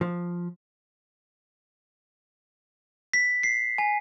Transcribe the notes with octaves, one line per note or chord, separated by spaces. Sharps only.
F3
B6
C7
G#5